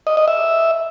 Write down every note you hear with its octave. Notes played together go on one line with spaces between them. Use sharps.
D#5
D#5
E5